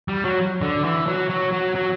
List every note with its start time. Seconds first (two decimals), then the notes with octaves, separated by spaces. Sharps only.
0.08 G3
0.24 F#3
0.62 D3
0.84 E3
1.07 F#3
1.29 F#3
1.52 F#3
1.75 F#3